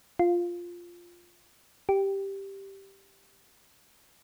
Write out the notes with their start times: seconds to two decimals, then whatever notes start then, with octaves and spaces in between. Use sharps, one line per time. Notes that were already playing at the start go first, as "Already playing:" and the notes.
0.19 F4
1.89 G4